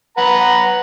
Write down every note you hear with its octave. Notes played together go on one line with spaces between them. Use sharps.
B4 F#5 A#5